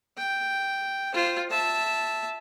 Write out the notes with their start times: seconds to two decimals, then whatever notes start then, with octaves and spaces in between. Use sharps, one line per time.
0.18 G5
1.14 F4 C5
1.50 E5 A5